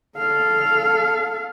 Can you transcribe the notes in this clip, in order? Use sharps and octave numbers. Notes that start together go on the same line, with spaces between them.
A4 F5